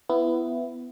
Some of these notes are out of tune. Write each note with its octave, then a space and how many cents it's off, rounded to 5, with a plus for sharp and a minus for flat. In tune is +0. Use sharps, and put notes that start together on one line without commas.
B3 +15 E4 +20